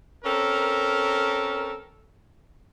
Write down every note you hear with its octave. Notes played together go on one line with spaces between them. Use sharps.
C4 C#4 A4 A#4